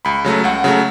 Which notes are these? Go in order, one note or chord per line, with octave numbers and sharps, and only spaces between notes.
C#2 B5
C#3 F#3 A3
C#2 F#5
C#3 F#3 A3